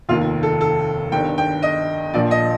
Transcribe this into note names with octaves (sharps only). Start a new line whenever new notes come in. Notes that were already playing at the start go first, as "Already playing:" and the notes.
F1 D#2 D#3 F4
A4
A4
G1 G2 D#3 G5
G5
D#5
A#1 A#2 F3 D5
D#5